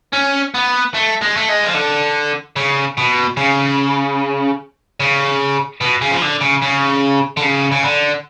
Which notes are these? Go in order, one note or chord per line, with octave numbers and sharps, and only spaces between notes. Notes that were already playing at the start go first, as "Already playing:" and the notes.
C#4
B3
A3
G#3
A3
G#3
F3
D3
C#3
B2
C#3
C#3
B2
C#3
F3
D3
C#3
C#3
D3
C#3
C#3
D3